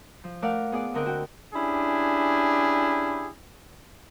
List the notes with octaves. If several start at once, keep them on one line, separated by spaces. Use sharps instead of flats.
F3
A3 A#4 D5 F5 F#5
B3 G#4 D5
D3 C4 A#4 D#5 G5 F#6
F#4 G5
C#4 D4 E4 G4 G#4